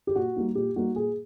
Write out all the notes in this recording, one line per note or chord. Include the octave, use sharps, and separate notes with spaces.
G4
A#2 F#4
G3 A#3 D#4
A#2 G4
G3 A#3 D#4 F#4
A#2 G#4